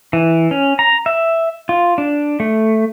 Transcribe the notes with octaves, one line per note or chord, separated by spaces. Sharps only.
E3
C#4
A#5
E5
F4
D4
A3